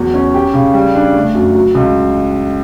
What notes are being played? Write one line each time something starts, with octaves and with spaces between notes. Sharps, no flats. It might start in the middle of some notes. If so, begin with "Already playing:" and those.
Already playing: E2 F#3
C#4
G4
C#3
G3
D4
A3
F#2
F#3
C#2